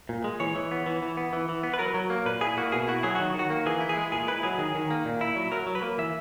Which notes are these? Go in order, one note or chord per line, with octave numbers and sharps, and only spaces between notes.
A#2
G#3
E3 C#5
E3
B3
E3
E3
B3
E3
E3
B3
B4
F#3 A#4
F#3
A#3
A#2 B4
E4 G#4
A#3 F#4
B2 G#4
E4 F#4
F#3 G#4
D#3 F#4
D#3
F#4
A#3
E3 G#4
E4
G#4
G#3
A#2 G#4
E4 B4
F#3 G#4
D#3 G#4
D#3
A#3
A#2
E4
F#3
F#3 A#4
F#3
B4
A#3
E3 E5